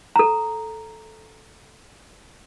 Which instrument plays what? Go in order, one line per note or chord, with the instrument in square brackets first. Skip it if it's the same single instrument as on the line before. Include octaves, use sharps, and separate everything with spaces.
[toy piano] A4 A#5